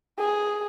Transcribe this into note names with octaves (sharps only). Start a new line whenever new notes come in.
G#4